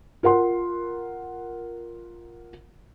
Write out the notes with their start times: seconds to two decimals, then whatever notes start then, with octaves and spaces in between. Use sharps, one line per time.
0.23 F4 A#4 F#5 C6